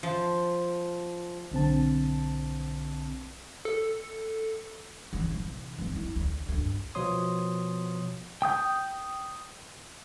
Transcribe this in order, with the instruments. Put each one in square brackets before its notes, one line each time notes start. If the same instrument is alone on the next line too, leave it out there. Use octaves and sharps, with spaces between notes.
[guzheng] F3
[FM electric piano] B1 D3 C4 A5
[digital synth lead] A4
[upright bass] C#3 E3
C3 E3
E3 C4
E4
D2
D2 G2
[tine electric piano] B2 F3 B3 C#5 C6 D#6
[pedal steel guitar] G5 D#6 G6